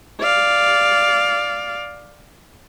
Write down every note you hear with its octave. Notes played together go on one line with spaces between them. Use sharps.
D5 F5